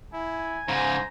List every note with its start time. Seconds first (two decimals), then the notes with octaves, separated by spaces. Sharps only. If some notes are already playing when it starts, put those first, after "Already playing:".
0.14 E4 G#5
0.68 G#2 C#3 C5 A#5